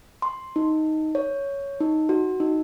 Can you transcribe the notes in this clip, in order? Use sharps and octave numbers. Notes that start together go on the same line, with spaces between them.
C6
D#4
C#5
D#4
F#4
D#4